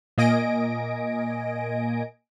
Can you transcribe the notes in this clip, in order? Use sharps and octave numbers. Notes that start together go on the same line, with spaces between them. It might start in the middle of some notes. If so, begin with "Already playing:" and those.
A#2 A#3 D#5 G#5 A#6 D7